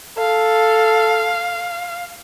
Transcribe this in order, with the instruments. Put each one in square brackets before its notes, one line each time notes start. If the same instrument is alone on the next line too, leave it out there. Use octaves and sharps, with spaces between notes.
[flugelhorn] A4 [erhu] F5